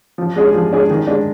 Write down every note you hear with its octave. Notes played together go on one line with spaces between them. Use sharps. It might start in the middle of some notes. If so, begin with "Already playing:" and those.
F3
G#3 D4 G#4 D5
F3
G#3 D4 G#4 D5
D#3
G#3 D4